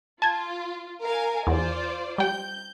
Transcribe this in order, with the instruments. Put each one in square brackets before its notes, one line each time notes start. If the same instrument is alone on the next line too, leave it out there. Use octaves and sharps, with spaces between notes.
[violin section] F4 [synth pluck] A5 G#6
[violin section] A#4 F5 G#5
[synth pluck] E2 [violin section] F4 C5 D5
[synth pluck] G3 G5 [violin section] G6